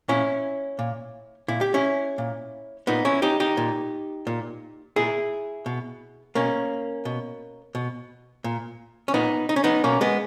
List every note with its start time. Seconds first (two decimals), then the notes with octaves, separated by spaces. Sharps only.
0.08 A#2 C#4 E4
0.79 A#2
1.48 A#2 E4
1.61 G4
1.74 C#4 E4
2.18 A#2
2.87 A#2 B3 D#4
3.05 C#4 E4
3.22 D#4 G4
3.40 D#4 G4
3.57 A#2
4.27 A#2
4.96 A#2 E4 G#4
5.66 B2
6.35 B2 A#3 C#4
7.05 B2
7.75 B2
8.44 A#2
9.08 C#4
9.14 A#2 B3 D#4
9.49 D#4
9.56 C#4
9.64 B3 D#4
9.84 B2 A#3 C#4
10.01 G#3 B3